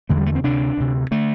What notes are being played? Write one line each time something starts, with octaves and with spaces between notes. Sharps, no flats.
E2 D3 A3
G3
A3
C4
D2 C3 D4
D2 C3
D3 A3